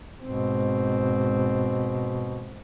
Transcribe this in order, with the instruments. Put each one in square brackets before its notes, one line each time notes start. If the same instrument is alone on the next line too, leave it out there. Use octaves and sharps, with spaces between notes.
[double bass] G#2 C4 [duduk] B2